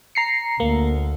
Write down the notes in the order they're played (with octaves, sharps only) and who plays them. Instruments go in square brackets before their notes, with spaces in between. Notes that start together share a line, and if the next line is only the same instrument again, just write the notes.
[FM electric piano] A#5 C7 C#7
[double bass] D2 [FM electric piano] A#3